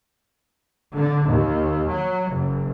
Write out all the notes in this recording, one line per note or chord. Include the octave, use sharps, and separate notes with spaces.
D3
D#2
F#3
F#1